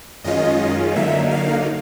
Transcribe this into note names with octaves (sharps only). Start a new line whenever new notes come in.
F#2 D#3 G#3 C#4 F4 D#5
D3 F#3 A#3 D#4 E5
F5